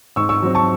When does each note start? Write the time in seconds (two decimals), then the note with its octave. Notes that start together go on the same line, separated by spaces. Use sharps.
0.16 G#2 C#6 E6
0.29 C#6 E6
0.43 F#3 C4
0.55 A5 C#6